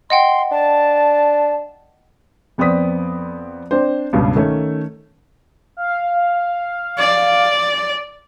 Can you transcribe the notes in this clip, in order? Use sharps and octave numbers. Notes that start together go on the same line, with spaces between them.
D#5 F#5 G5 C6
D4 A5
F2 B3 C4 D5 D#6 B6
C4 D4 C5
C#2 G2 B2
D#3 A3 C#4
F5
D5